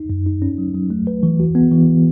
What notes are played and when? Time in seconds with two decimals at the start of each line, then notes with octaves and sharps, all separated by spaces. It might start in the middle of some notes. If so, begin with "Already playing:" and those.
Already playing: D#4
0.10 F#2
0.26 D#4
0.42 C#4
0.58 F#3
0.75 F#3
0.90 A3
1.07 B4
1.23 E3
1.40 F#4
1.55 B3
1.72 E3